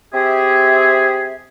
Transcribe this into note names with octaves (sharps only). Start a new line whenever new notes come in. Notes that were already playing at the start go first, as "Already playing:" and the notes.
C4 G4 G#4 E5